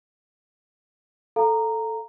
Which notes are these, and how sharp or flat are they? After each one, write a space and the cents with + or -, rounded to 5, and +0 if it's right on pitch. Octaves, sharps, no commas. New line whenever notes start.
A4 +0 F5 +0 A#5 -10